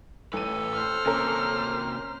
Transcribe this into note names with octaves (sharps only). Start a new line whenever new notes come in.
A1 A2 A4 B4 D#7
C5 F6
C3 A#3 C#4 A#4